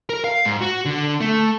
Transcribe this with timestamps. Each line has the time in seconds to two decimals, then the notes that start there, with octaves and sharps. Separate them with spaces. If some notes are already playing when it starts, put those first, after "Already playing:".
0.09 A#4
0.24 F5
0.45 G#2
0.61 F#4
0.85 D3
1.21 A3